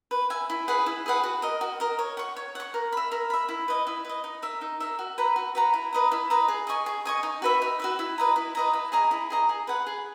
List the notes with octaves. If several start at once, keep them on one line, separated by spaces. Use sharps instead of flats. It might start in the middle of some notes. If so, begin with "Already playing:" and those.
B4
E5 G#5
E4
G#4 B4 F#5
E4
G#4 B4 F#5
F#4
A#4 D#5
F#4
A#4 D#5
C#5
F#5 C#6
C#5
F#5 C#6
A#4
E5 B5
A#4
E5 B5
E4
B4 D#5
E4
B4 D#5
D#4
A#4 E5
D#4
A#4 E5
F#4
B4 F#5 A#5
F#4
B4 F#5 A#5
E4
B4 D#5 A#5
E4
B4 D#5 A#5
G#4
D#5 G#5 C#6
G#4
D#5 G#5 C#6
D#4
F#4 B4 E5
D#4
F#4 B4 E5
E4
B4 D#5 A#5
E4
B4 D#5 A#5
E4
G#4 D#5 A#5
E4
G#4 D#5 A#5
G#4
B4 F#5
G#4